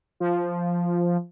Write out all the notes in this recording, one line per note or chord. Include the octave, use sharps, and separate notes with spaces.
F3